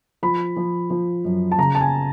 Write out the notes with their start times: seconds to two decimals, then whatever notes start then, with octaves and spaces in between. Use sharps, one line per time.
0.23 F3 B5
0.56 F3
0.90 F3
1.25 F#2
1.52 A5
1.58 C#3 A#5
1.75 A5
1.81 G#5